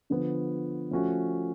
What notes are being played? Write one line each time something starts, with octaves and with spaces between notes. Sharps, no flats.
D3 F3 B3
F3 A3 C#4 F#4